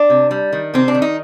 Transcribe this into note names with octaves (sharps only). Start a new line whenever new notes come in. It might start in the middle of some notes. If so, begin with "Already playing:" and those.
Already playing: D4
C3
G3
D#3
C3 C4
D4
D#3
D#4